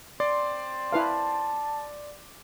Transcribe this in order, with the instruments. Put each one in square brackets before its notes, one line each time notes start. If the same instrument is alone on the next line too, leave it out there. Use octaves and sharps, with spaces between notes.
[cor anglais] C4 [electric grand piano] D5 C6 D6
[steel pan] E4 B4 F5 [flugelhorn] A5